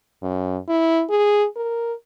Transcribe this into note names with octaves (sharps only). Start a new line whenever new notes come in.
F#2
E4
G#4
A#4